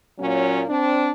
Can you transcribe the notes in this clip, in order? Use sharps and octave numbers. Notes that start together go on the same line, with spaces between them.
A#2 F#3 A#3 C#4
C4 D4